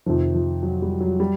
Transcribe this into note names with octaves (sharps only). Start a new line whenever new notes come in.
F2 C3 D#3 F3
F3
F#3
G3
F#3
G3